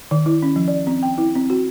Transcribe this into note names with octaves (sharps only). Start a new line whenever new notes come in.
D#3
E4
C#4
F3
D5
C4
G5
E4
C4
F#4